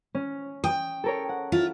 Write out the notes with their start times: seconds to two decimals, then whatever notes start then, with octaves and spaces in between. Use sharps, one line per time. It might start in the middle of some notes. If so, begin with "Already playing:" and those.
0.15 C#4
0.64 G5 D#6
1.04 A4 A#4 C#5
1.29 F#5
1.52 E4 F4